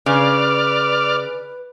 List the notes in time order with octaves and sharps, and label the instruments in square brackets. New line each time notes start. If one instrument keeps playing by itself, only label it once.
[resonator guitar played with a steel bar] C#3 [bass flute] B4 [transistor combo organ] D5 F6